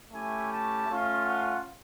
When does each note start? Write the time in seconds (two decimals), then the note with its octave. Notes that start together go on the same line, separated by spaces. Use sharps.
0.12 A3 C#4 E4 G4 G#5
0.50 A5
0.88 A3 C#4 F4
1.24 F#5